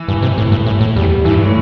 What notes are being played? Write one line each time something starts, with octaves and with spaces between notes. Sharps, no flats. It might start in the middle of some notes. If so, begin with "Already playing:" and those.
Already playing: E3
G2
C3
A2
G2
A2
A2
E2 G3
G2 E3
A2